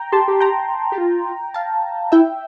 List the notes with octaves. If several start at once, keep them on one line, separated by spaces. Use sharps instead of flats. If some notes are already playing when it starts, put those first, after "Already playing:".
Already playing: G5 A#5
G4 A5 C6
G4
G5 A#5
G4
F4
F5 A5
E4 E5 G5